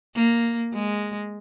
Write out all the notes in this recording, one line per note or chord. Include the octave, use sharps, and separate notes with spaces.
A#3
G#3